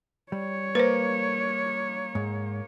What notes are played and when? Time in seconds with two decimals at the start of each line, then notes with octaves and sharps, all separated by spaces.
0.32 G3 C#5
0.75 A#3 B4 C5
2.15 G#2